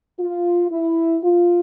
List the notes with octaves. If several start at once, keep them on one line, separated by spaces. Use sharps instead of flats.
F4
E4
F4